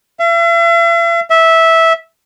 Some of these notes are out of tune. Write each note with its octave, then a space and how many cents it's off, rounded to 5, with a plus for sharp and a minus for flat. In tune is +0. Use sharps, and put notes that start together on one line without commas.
E5 +45
E5 -10